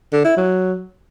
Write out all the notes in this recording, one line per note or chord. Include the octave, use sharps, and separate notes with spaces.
D3
E4
F#3